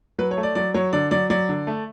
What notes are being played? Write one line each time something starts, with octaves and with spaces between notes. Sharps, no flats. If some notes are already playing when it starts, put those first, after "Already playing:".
F#3 B4
C#5
A3
D5
F#3 D5
F#3 C#5
D3 D5
F#3 D5
F#3 D5
D3
A3